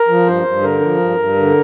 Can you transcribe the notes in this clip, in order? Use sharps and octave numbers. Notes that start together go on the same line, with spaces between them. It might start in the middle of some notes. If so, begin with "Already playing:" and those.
Already playing: A#4
F3
G2 C5
G2
D3 A#4
F3
G2
G2
D3